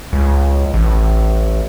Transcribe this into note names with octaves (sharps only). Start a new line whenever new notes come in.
C#2
A1